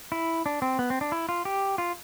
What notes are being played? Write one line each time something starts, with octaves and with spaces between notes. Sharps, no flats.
E4
D4
C4
B3
C4
D4
E4
F4
G4
F4